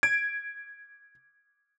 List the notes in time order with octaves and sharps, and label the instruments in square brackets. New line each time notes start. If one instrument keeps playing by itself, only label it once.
[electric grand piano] G#6 D7